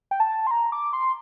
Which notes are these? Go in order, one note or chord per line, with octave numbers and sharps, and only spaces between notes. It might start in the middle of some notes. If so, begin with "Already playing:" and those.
G5
A5
C6
A#5
D6
C6